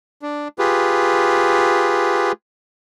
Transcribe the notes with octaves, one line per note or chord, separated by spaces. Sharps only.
D4
F4 G4 G#4 B4